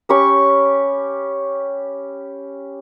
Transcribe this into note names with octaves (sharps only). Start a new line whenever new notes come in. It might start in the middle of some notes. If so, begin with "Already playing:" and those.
C#4 G4 B5 C#6